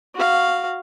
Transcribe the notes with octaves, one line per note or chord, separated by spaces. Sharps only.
F#4 F5